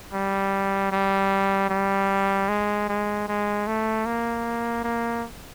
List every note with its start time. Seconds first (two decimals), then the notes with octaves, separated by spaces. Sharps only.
0.13 G3
0.92 G3
1.70 G3
2.49 G#3
2.89 G#3
3.28 G#3
3.67 A3
4.06 A#3
4.84 A#3